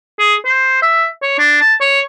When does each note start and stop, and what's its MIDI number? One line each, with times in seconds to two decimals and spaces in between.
0.19 0.35 68
0.45 0.80 72
0.82 1.07 76
1.22 1.36 73
1.38 1.56 62
1.61 1.74 81
1.81 2.01 73